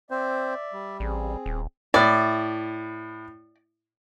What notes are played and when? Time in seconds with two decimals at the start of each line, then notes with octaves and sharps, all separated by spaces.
0.11 C4 C5 D5 E5
0.73 G3
1.00 A1 C4 G#4
1.46 D#1
1.94 A2 E4 D5